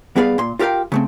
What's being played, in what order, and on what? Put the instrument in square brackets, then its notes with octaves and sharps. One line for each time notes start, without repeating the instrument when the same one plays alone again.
[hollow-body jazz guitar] G2 B3 G#4 B4 D5 F5
A#2 C6
F4 G4 A#4 F5 G5
C#3 A3 C4